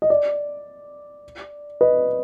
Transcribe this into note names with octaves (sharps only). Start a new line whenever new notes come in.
D#5
D5
B4 D#5